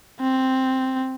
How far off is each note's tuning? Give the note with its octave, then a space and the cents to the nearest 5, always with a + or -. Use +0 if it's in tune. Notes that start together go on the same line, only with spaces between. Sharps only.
C4 +0